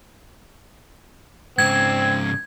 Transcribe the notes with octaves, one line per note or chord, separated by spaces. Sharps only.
G#2 C#3 C4 G#6